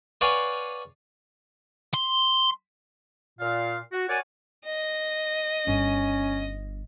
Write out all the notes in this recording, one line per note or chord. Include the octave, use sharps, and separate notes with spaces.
B4 C#5 D5 F5 F#5 G#5
C6
A#2 F5
F#4
F#4 A#4 C#5 D5 F#5 G#5
D#5
G1 C#4